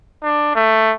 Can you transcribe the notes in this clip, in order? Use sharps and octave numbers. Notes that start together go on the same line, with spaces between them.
D4
A3